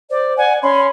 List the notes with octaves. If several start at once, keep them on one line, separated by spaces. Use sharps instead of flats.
C5 D5
D5 F#5 G#5
C#4 B5 C6